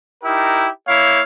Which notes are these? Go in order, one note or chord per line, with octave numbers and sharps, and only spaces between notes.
D#4 E4 G4 A#4
A#3 E4 C#5 F5